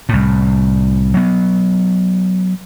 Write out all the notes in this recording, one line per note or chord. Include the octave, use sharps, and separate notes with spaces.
C2 A2
F#3 B3